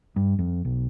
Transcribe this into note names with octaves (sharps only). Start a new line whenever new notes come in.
G2
F2
B1